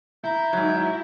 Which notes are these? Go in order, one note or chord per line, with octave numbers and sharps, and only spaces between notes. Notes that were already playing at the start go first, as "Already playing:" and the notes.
E4 A#5 G6
G#2 F#3